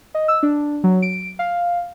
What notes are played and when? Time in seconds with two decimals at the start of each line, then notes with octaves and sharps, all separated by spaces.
0.15 D#5
0.28 E6
0.43 D4
0.84 F#3
1.02 D7
1.39 F5